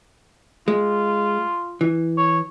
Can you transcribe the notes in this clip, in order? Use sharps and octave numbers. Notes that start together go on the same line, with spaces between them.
G#3 F4
E3
C#5